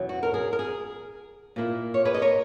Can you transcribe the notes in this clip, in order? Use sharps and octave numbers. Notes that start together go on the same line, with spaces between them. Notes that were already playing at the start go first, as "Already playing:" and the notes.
Already playing: E2 B2 F#3 C#4 E4
F#4
A#4
G#4
A#4
G#4
A#2 A#3 E4
C#5
G#4 B4
D#5
A#4 C#5